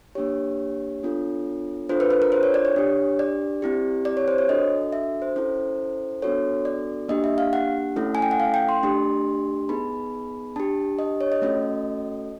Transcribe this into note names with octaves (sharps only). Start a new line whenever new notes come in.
A#3 D4 G4 C#5
B3 D4 F4 A4
D4 F4 A4 C5
B4
B4
A#4
C5
C#5
D5
C#5
D4 G4
D5
C4 E4 G4
D5
C#5
C5
C#5
D4 F#4 A4 D#5
E5
C5
C#4 E4 A4 C5
B3 D4 F#4 A4 C#5
D5
A#3 D4 G4 D#5
E5
F5
F#5
A3 C#4 E4 A4
G#5
G5
F#5
F5
G5
C6
A3 D4 G4
B3 D#4 G#4 B5
D4 G4 A5
D#5
C#5
D#5
A3 C#4 F#4 A4 D#5